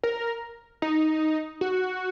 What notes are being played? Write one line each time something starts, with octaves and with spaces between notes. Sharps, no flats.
A#4
D#4
F#4